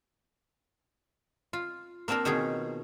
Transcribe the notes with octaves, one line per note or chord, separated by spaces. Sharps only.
F4
A#3 C4 D4 F4 A#4
B2 D#3 C#4 G#4